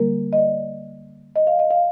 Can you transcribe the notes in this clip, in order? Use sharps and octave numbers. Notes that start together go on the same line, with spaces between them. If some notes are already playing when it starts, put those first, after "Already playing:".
Already playing: D3 G3 A#3 A#4
D#5
D5
D#5
F5
D#5
F5